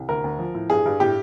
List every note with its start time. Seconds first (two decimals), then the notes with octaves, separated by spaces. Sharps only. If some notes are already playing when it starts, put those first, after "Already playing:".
Already playing: C2
0.09 D2 A#4
0.24 D2
0.39 F3
0.54 A2
0.70 G2 G#4
0.86 G2
1.00 A2 G4